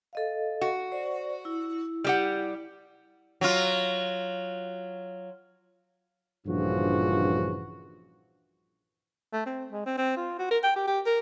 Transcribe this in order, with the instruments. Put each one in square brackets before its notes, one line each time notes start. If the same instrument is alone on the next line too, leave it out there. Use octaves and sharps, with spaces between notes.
[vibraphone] A4 D#5 F5
[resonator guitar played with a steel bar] F#4
[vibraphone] C5 D5
E4
[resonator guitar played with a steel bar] G3 G4 F#5
[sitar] F#3 F4
[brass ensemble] A#1 G2 C#3 E3 F3 F#4
[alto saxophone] A3
C4
G#3
C4
C4
F4
F#4
A#4
G5
G4
G4
A#4